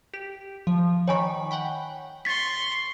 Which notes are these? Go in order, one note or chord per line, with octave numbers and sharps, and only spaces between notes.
G4
F3
D#3 C#5 G#5 B5 C#6
F#5 G5 B5
C6 C#6 A6 B6